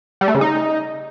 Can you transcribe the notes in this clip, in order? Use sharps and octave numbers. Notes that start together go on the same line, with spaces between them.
G3
A3
C#3
D#4